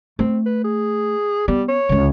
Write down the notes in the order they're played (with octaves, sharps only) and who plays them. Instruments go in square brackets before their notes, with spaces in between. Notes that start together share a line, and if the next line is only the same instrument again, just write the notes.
[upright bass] A3 [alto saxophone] C4
[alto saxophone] B4
G#4
[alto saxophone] G3 [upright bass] B3
[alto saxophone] C#5
[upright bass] C#2 D3